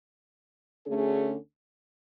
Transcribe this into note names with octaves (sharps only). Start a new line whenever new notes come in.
D2 D3 A3 C#4 G#4